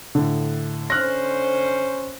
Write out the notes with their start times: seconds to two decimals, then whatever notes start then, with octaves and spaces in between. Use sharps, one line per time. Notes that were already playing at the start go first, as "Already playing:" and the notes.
0.15 A2 D3
0.90 D3 C#4 C5 F6 F#6 A#6